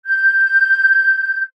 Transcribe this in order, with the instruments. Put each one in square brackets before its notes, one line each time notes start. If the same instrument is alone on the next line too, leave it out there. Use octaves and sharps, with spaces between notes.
[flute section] G6